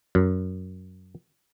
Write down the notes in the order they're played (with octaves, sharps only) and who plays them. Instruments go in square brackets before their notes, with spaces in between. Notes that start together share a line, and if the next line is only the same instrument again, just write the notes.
[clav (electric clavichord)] F#2